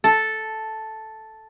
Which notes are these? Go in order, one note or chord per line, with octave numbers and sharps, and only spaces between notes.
A4